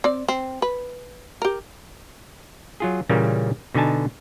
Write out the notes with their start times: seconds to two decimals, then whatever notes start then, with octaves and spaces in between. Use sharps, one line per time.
0.04 C4 D5
0.28 C4
0.62 B4
1.42 G4 A#4
2.80 F#3 F4 G#4
3.09 A#2 C#3 E3 G3 A#3 C#4
3.74 B2 D3 D#4 G#5 A5